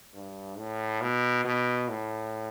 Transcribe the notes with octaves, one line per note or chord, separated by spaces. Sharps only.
G2
A2
B2
B2
A2